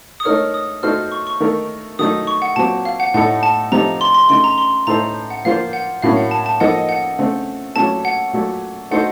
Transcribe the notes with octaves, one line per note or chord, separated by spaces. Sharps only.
D#6
A3 D#4 A#4 C#5 F6
D#6
A3 D#4 F#4 A4 C5 F6
C#6
C#6
D#3 A3 D#4 A#4
D#3 F#3 A3 D#4 D#6
C#6
F#5
A#2 F#3 C4 A5
F5
F#5
A2 A3 D#4 A4 F#5
A5
C3 F3 A3 D#4 A#5
C6
C6
C#3 A3 D#4 C6
A#5
C6
A2 A3 D#4 A4 C5 A#5
F#5
A#2 F3 A#3 F4 C5 F5
F#5
A2 F#3 A#3 C#4 F5
F#5
A5
A5
F3 A#3 D#4 A4 D#5 F#5
F#5
C#3 A3 C4
A#2 F#3 A3 C#4 A4 A5
F#5
A#2 F#3 A3
A3 D#4 F#4 C5 F#5